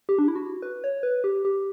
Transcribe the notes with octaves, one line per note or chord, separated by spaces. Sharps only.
G4
D4
E4
F#4
B4
C#5
B4
G4
G4